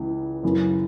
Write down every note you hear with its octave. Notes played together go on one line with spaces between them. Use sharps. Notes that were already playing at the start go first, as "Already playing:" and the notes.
Already playing: C#2 C#3 E3
F#2 C#3 E3